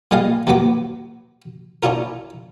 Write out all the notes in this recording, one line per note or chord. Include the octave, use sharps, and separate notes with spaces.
A#2 G3 G#4 D#5 F5
D#2 A#2 F#3 B3 D6
C#4 D4 E4 F4 A#4